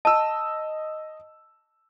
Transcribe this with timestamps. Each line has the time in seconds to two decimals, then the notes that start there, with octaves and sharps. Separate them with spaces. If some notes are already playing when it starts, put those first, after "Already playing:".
0.05 D#5 A5 E6